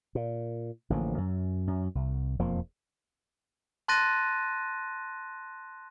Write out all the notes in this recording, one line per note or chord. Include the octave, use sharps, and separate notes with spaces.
A#2
A1 D3 F3 A#3
F#2
F#2
C2
E1 F2 F3 A#3
A5 C6 F#6 A6 A#6 D#7